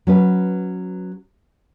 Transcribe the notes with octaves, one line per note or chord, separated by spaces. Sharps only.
F#3 C#4 B4